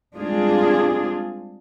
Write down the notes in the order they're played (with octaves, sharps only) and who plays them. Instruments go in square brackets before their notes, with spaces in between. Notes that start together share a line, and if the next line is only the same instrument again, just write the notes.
[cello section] G3 G#3 C4 D4 F4 G#4